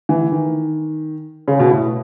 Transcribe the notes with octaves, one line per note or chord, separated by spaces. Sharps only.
E3
D#3
C#3
B2
A2